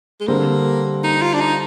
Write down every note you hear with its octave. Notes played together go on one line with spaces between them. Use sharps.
G#3
D3 G3 A#3 C4
D#4
F4
D4
D#4